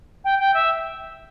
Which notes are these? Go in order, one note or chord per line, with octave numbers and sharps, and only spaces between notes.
G5
G5
E5